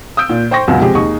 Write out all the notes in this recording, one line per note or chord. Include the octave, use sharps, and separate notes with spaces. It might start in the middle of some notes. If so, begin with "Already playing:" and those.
D#6 E6 G6 D7
A#2
C5 G5 C6 C#6 A#6
C#2 F#2 B2
C3 F3 G#3 G4 G#4
D#2 D#4 G#4 C#6